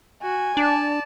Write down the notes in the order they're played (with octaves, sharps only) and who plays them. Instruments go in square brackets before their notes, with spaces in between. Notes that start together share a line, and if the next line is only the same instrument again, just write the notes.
[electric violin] F#4 [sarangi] G#5
[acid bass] D4 [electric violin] D5 A5